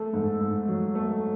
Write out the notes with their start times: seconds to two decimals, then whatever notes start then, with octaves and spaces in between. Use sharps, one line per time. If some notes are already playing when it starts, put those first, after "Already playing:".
Already playing: A3 A4
0.13 G#2
0.41 G#2
0.68 F#3
0.95 A3